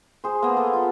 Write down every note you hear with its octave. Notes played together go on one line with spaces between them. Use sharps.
G#4 C5
A#3 B3
A4
F4